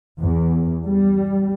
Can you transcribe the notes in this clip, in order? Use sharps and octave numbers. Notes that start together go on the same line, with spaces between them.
E2
G3